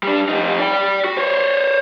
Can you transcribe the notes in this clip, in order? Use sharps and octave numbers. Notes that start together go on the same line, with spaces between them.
G3 D4
F2 D#4
D5 G5
F#4
C5 C#5